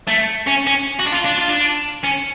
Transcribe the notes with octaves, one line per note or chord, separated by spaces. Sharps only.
A3
C#4
C#4
F#4
D4
F4
D4
F4
D4
C#4